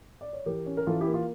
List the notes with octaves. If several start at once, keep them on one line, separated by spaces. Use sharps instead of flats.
D5
C#5
E3 G4 A#4
C#4
A#4
E3 F4 A4
E4 G4
A#3
F4